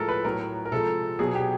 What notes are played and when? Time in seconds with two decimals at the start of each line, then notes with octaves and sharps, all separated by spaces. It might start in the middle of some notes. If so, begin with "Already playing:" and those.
Already playing: A2 F3 G#3 A4 A#4
0.09 B4
0.24 A2 F#3 A#4
0.65 A#4
0.72 C3 F3 G#3 A4
1.19 B2 F#3 G#4
1.35 G4